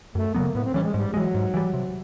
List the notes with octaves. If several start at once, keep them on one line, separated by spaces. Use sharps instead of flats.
F#2 A3
C#3 F#3 A#3 B3
A2 B3
C4
E3 G3 C#4
G#3
G#2 G3
E3 F#3 G#3
G#2
E3 G3
C3